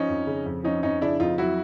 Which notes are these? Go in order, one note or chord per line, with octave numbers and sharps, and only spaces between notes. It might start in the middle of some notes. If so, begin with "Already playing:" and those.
Already playing: F3 C#4 D#4
F2
C#3
F2
F3 C#4 D#4
F2 C#4 D#4
C#3 D4 E4
F2 D#4 F4
F#3 E4 F#4